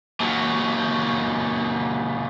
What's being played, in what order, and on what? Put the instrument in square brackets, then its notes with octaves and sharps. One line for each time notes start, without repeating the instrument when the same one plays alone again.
[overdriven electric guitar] A#2 F#3